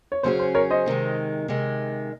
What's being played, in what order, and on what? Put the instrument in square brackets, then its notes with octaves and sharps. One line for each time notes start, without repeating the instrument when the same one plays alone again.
[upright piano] C#5
[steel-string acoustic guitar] C#3 F#3 C#4 G#4 [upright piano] C5
[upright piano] C5
A#4 C#5
C5 D#5
[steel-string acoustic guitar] C3 D#3 G#3
C3 D#3 G#3